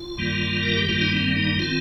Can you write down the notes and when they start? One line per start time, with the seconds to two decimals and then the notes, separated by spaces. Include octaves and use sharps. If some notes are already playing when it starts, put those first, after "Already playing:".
Already playing: F4
0.18 G2 D#3 G3 A#3
0.63 A#4
0.76 G4
0.89 G2 D#3 G3 A#3 F4
1.02 D#4
1.13 C4
1.36 D#4
1.59 D#3 C4 F4